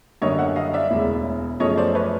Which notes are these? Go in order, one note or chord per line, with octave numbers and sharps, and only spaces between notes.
F#2 D3 G3 A#3 C#5 D#5
E5 F#5
D#5 F5
D5 E5
E1 D2 C#3
F#2 C#3 F3 A3 C#5 D#5
C5 D5
B4 C#5